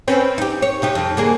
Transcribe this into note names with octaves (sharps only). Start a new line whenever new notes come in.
C4 C#4 B4
D#4 G4
C#5
C3 D#4 G4
F2
D3 A#3 G#4